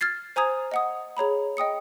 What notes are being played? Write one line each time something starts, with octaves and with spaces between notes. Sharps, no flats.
F6 G#6 A6 C7
C5 G#5 A#5 D#6 G#6
D#5 F#5 D#6
G#4 C#5 A#5 B5
D#5 G5 D#6 C#7